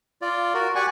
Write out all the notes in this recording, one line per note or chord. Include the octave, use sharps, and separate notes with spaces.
F4 D5
F#4 A#4
G4 D5 F#5 G#5 C#6